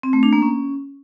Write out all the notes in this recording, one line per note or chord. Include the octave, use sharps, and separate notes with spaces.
C4
A3
D4
A#3
C#4